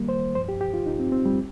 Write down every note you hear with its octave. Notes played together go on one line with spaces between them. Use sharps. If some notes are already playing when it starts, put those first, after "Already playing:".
Already playing: D#2 D#3 G3 A#3
C5
G2 F3 C5
G4
G4
F4
D#4
C4
C4
G3